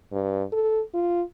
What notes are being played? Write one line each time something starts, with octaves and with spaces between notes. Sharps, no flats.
G2
A4
F4